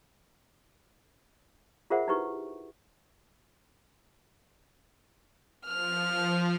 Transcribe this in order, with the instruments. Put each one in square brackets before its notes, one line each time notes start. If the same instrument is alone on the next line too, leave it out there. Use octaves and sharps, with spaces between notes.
[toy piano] F4 G#4 A#4 C5 E5 F#5
D#4 E4 G4 B4 C#6
[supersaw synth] F3 [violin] F6